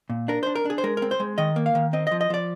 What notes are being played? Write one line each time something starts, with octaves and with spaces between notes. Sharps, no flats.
A#2
D4 A#4
D4 C5
A#4
D4 G#4
C5
G#3 A#4
A#4
C4
C5
G#3
D#3 D#5
A#3
F5
D#3
C4 D#5
D#5
F3
D#5
F3 D5